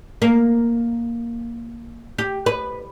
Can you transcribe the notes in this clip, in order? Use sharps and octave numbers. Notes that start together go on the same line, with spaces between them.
A#3
G4
B4